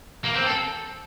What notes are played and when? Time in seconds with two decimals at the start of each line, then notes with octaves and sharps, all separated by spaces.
0.24 A#3
0.35 C4
0.46 A4